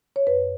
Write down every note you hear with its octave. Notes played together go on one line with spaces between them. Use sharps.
C#5
F#2 B4